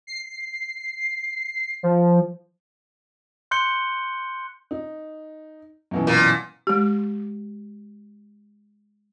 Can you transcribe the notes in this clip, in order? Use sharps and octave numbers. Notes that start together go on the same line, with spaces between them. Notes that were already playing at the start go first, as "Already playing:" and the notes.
C7
C7
F3
C6 F#6 G6 C#7 G7
D#4
F#2 B2 E3
A#2
G#3 G4